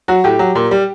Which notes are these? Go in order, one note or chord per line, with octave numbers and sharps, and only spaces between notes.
F#3 F#4
A2 G4
F#3
A#2
G3